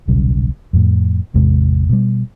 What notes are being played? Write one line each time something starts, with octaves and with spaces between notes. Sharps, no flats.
D#1 B1 C#3 G3
F2 A2
A1 E2 C3 G#3
B2 G3